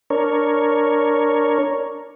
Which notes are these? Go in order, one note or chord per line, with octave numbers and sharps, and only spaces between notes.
D4 A#4 C#5